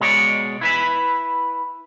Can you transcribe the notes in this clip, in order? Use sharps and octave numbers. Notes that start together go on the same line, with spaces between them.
B2 G#3 C#5 D5
E4 B4 E5